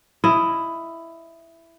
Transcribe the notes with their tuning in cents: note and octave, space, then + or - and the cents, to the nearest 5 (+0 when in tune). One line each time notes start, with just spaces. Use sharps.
E4 +10 D#5 +5